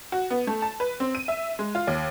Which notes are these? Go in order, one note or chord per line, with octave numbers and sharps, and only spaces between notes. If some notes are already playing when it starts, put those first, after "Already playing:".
F#4
B3
A3
A5
B4
C4
D#7
E5
G#3
F4
D#2